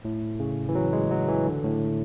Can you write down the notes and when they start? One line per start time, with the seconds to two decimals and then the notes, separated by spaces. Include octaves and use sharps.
0.05 A2
0.40 C#3
0.69 E3
0.75 F#3
0.93 G#3
1.11 F#3
1.28 E3
1.46 D3
1.64 A2